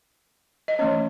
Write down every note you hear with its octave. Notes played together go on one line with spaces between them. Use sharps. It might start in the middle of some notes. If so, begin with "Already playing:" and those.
D#5
E3 A3 C#4 C#5